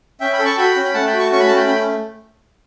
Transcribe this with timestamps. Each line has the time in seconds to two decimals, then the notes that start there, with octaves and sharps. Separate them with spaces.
0.20 C#4 E5 G5
0.33 G5 B5
0.39 A4
0.45 A5 C#6
0.57 F#4 G5 B5
0.76 C#4
0.85 B5
0.94 A3 F#5 A5
1.07 G5 B5
1.13 F#4
1.19 A5 C#6
1.31 C#4 C#6
1.40 B5
1.47 A3 A5
1.56 G5 B5
1.68 C#4 G5 B5